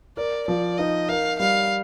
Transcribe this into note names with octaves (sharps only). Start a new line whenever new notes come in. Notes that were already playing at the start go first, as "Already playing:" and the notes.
A#4 D5
F3 D5
D#4 D#5
A#4 F5
G3 F5